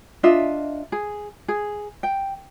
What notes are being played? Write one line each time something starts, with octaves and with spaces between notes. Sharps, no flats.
D4 F4 D#5 E5
G#4
G#4
G5